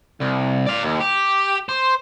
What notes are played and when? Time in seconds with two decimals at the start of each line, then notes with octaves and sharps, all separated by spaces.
0.21 C2
0.67 D5 F5
0.83 D#2
1.00 G4
1.69 C5